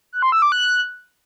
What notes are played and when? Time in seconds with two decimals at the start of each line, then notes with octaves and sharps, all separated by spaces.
0.13 F#6
0.22 C6
0.32 E6
0.42 D6
0.52 F#6